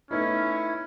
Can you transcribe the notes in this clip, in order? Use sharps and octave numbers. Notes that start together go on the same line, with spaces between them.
A3 B3 C#4 D#4 E4